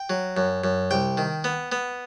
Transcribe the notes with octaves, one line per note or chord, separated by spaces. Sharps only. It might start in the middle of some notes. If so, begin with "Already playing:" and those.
Already playing: G5
F#3
F#2
F#2
C2 G5
D#3
B3
B3